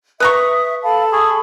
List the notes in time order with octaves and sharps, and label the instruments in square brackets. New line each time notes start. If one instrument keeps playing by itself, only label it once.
[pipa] B4 A#5 C#6 [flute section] E5 [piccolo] D#6
[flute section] A4 A5 B5 [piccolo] F5
[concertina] G#4 [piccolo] C#6